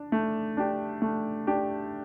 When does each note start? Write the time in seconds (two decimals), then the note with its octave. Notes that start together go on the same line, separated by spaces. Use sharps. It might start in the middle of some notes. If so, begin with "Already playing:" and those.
Already playing: D4
0.12 A3
0.57 D4 G4
1.02 A3
1.47 D4 G4